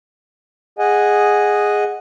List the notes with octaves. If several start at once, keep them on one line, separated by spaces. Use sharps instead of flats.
G#4 D#5 F#5 G#5